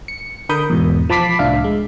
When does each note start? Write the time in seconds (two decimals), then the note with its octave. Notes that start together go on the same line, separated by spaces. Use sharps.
0.08 C#7
0.49 D3 A#4 B5 D#6 G6
0.70 E2 G#2 B2
1.09 F3 A5 B5 D6 B6 C7
1.39 C2 A2 D4 E5 F5
1.64 G#3